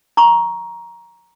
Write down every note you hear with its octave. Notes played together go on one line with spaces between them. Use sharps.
A#5 C#6